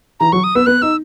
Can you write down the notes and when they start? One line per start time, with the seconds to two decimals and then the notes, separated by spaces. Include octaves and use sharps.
0.20 E3 A#5
0.32 F#3 C#6
0.44 D#6
0.55 B3 E6
0.66 B3 F#6
0.82 D#4 E6